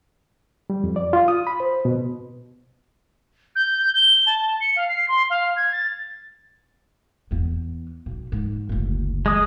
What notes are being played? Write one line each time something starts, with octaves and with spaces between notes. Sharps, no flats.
G3
F2
D5
F4
D#6
B5
C5
B2
G6
G7
A5
C#7
F5
C7
C6
F5
G#6
A6
E2 B3
B1
G#2
F#1 D2
G#3 D#6